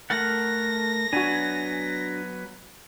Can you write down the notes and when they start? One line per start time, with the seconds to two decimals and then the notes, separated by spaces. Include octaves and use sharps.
0.10 A3 A#4 F#5 A#6
1.13 F#3 B3 D4 F#4 G#5